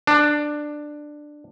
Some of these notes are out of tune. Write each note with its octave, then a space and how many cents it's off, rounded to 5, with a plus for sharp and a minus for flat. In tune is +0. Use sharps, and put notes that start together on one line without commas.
D4 +10